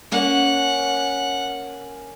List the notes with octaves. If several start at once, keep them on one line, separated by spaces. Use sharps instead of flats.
A#3 C#4 F#5